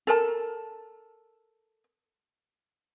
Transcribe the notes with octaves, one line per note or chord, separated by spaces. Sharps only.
A4 A#4 A5